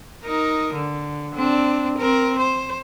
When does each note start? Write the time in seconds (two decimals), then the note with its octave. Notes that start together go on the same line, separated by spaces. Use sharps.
0.24 D#4 A#4
0.74 D3
1.35 C4 D4
1.98 C4 A#4
2.39 C5